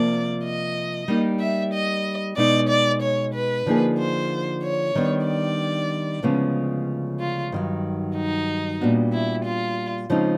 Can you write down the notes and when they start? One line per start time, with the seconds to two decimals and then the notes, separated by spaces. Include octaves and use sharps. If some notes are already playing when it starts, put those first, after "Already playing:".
Already playing: C3 F3 A#3 D5
0.45 D#5
1.08 G3 A#3 D#4
1.40 E5
1.74 D#5
2.37 B2 G#3 B3 D#4 D5
2.69 D5
3.02 C#5
3.34 B4
3.66 D3 F3 A#3 D#4 G#4
3.99 C5
4.63 C#5
4.95 D#3 G3 B3 D4
5.27 D5
6.23 D2 C#3 F3 G#3 B3
7.19 F4
7.52 G2 D#3 F#3
8.17 D#4
8.81 A#2 G3 B3 D4 F#4
9.12 E4
9.45 F4
10.10 C#3 F3 G#3 C4 D#4